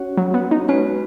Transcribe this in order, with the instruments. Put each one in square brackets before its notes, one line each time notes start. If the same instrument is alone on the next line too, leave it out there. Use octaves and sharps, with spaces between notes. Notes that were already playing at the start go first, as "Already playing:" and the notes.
Already playing: [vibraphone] C#4 F#4 C#5 F#5
[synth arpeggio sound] F#3
B3
D#4
[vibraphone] G#3 B3 F#4 B4 [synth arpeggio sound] C#4